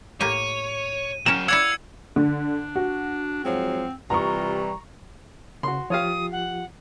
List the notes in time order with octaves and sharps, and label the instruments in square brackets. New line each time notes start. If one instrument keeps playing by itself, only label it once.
[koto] A2 A#3 G4 [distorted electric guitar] C#5 [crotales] D#7
[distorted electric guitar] F#3 G5 [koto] C#4 A#4 [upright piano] E7
[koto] E4 D5 F#5 [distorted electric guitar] F5 [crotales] E6 G#6 C#7
[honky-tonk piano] D3 [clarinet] D4
[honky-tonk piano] F#4
[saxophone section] G#2 F3 F#3 [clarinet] C4
[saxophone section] C3 E3 G3 [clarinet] F4 [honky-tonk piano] A#5 C#6
[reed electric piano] C#3 [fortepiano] F#4 C6
[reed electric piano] F3 F4 G4 [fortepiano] C#5 F5 [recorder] D#6
[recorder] F#5